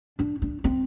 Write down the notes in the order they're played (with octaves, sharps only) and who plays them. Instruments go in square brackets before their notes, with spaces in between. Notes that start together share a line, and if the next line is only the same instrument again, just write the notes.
[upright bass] D4
D4
C4